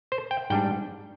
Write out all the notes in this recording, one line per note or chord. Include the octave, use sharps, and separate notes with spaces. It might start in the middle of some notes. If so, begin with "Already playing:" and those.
C5
G5
G#2 G3 D4 G5